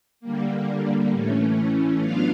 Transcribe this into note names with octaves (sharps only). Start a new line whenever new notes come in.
D3 G3 A#3
A2 E3 A3 C#4
F#3 B3 D4 F4 F5